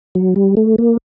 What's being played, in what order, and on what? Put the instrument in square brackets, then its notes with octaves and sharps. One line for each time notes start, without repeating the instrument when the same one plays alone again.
[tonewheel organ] F#3
G3
A3
A#3